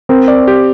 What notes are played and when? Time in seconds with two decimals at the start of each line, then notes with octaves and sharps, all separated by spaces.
0.09 C4 A#4
0.28 D5
0.48 G4